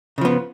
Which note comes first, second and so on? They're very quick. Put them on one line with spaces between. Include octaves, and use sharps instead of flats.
C#3 F3 B3